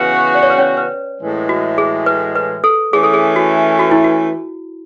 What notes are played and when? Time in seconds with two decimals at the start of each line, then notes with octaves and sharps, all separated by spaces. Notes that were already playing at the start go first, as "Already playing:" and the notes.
Already playing: C#3 E3 B3 F#4 B4
0.35 D5
0.43 C#5
0.50 B4
0.58 C#4 C#5
0.77 B4
1.20 A2 E3 G#3
1.49 F#4
1.78 G#4
2.06 B4
2.36 B4
2.64 A4
2.93 E3 A3 C#4 G#4
3.03 A4
3.14 G#4
3.36 F#4
3.79 F#4
3.91 E4
4.04 F#4